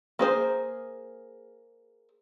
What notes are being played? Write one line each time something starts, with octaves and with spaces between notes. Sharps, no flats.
A#3 G#4 C5